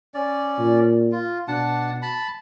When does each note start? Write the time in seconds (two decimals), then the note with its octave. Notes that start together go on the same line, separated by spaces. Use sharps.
0.14 C#4 D5
0.59 A#2
1.12 F4
1.48 B2 D4 F#5 A5
2.02 A5 B5